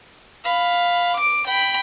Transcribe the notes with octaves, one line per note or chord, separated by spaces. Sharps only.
F5 B5
D6 D7
G5 B5